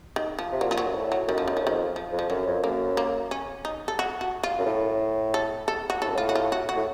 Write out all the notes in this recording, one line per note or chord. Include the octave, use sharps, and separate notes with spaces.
D#3
F3
C3
A#2 F#3
F3
F#3
F#2
A2
F#3
F#2 D#3
F3
D#3
F3
F2 D#3
F3
F2
F3
F#2 F#3
F2
F#2 A#3
A#3
C#4
D#4
A4
F#4
F#4
F4
F#2
A2
A4
A4
F#4
A2 A4
F#2
A2 F4
F#4
F4
F#4
F#4
A2